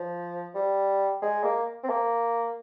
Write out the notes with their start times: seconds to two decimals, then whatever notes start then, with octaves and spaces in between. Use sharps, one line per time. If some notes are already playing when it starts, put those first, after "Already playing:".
Already playing: F3
0.55 G3
1.22 G#3
1.44 A#3
1.83 C4
1.89 A#3